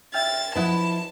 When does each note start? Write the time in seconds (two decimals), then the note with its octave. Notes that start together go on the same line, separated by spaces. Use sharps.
0.14 E5 G5 F6 A6
0.55 F3 E4 B4 D#5 F#5 A5